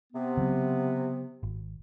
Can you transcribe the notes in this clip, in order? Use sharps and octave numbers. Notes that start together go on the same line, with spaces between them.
C3 B3
C#3 F#3 C4
G#1